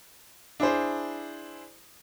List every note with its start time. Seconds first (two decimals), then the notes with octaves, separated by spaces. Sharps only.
0.60 D4 E4 G#4 C5